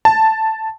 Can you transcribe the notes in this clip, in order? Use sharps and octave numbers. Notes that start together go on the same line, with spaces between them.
A5